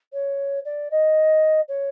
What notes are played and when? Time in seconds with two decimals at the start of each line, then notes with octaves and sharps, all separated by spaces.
0.13 C#5
0.65 D5
0.91 D#5
1.68 C#5